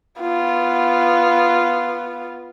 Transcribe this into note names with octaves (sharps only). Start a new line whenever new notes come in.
B3 F4